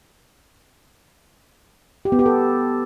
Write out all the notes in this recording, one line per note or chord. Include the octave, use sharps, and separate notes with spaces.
G4
B3
G4
A4